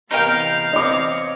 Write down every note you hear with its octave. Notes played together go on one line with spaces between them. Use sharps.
E2 C3 B3 D#4 A#4 F5 G5
E2 C4 C#5 D#5 D6